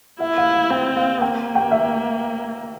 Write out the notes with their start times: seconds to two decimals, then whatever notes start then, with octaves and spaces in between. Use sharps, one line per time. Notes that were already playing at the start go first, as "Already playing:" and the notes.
0.20 E4 E5
0.38 F5
0.54 F5
0.70 C4 G5
0.97 F5
1.21 A#3 G5
1.55 G5
1.71 E5